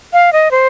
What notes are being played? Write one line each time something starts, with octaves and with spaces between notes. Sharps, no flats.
F5
D#5
C5